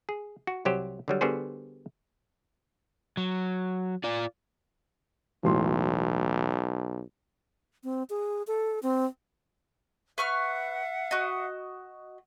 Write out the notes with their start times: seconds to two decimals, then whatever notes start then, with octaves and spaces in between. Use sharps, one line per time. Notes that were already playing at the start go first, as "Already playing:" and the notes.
0.09 G#4
0.47 F#4
0.65 C2 F#3 G4 C5
1.08 D3 F#3 G3
1.21 D3 G3 B3 F#4 G#4 C5
3.17 F#3
4.04 F4 D5
5.44 E1 B1 A2 C6
7.84 C4
8.10 G#4
8.47 A4
8.83 C4
10.18 B4 E5 F#5 C#6 F6
11.11 F#4 D#5